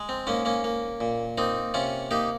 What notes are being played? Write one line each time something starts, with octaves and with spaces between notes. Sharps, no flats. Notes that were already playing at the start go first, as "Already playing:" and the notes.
Already playing: G#3
C4
G#2 A#3 C#4
A#3 C#4
A#3
A#2
A#3 C4 D#4
C3 C#4 F4
A#3 D#4 G4